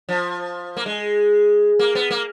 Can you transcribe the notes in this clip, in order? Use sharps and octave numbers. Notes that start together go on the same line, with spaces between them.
F3
A#3
G#3
A#3
B3
A#3